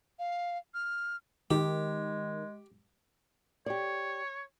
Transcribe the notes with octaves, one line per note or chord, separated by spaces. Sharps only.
F5
F6
D#3 G#3 G4
G4 C#5 D5